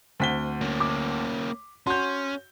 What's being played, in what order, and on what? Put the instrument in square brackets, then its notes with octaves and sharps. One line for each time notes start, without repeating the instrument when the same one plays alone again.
[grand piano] D2 B6 G7 [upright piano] C4 F#5
[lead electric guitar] A#3 C#4
[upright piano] D6
[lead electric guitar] C#4 [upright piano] F#4 [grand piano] C6 G6